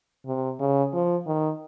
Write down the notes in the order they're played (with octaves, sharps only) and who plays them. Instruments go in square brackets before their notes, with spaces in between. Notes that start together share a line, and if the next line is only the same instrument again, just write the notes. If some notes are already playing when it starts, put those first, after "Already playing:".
[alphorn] C3
C#3
F3
D#3